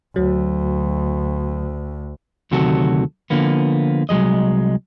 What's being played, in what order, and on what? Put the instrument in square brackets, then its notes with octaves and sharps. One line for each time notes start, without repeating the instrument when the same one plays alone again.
[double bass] D2 [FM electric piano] F#3
[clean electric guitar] D2 C3 D#3 F#3 F#4 A4
D3 F3 A#3 B3
C2 F#3 G#3 D#5